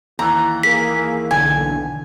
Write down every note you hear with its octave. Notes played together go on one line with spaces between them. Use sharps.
D#2 E3 A#5
A#3 G#4 B6
B1 D3 G#5